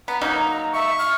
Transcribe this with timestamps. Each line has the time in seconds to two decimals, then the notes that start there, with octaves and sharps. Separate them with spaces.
0.08 B3 A#5
0.21 F#3 A#3 D#4 A#5
0.73 E5 C#6
0.99 F6